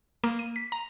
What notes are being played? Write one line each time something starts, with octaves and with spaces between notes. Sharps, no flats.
A#3
D#7
B6
A#5